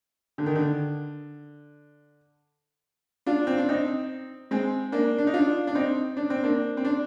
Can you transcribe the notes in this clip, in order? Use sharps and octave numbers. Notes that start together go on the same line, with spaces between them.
D3
D#3
D3
D4 F4
C4
D4
C4 D#4
G#3 C4
A#3 D4
D4
D#4
D4 F4
D4
C4 D#4
D4
C4
A#3 D4
C4
D4